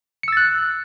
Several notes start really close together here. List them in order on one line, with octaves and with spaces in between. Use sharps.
C#7 E6 A6 F#6